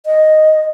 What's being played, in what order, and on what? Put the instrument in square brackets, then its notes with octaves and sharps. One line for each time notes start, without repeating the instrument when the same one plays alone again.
[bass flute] D#5